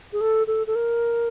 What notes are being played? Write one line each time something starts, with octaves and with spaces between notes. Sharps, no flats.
G#4
A4
A4
A4
A#4